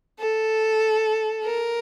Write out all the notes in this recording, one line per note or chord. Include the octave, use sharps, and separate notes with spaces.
A4
A#4